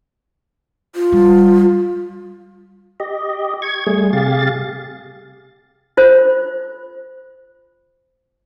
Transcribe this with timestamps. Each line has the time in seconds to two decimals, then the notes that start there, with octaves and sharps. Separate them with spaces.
0.96 F4
1.12 G3
3.00 G4 D#5
3.62 C#6 G#6
3.87 G3 A3 G#4
4.13 C3 G4 G#4 F5 A6
5.97 F4 C5